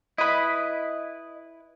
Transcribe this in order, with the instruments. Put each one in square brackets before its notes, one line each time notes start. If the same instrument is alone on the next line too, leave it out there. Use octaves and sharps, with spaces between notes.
[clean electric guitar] E4 B4 [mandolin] D#5 B5